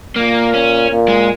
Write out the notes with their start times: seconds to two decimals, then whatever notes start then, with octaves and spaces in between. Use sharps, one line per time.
0.16 A#2 A#3
0.54 C#4
0.90 A#2
1.09 G#3